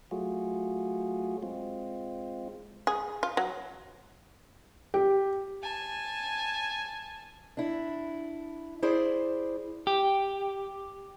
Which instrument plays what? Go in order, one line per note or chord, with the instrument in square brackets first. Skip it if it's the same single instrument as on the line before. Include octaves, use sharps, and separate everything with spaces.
[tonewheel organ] F#3 A3 F4 F#4 G#4
G#3 C4 F4
[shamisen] G#4
F4
F#3
[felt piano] G4
[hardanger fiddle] G#5 A5
[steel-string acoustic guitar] D4 E4
E4 G#4 C5 D5
[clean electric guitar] G4